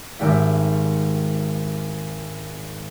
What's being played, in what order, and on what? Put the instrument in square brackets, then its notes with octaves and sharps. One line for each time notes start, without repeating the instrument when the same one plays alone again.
[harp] G#1 G4 E5